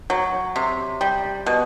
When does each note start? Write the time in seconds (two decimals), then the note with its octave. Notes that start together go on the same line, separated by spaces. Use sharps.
0.10 F#3
0.56 C3
1.01 G3
1.46 B2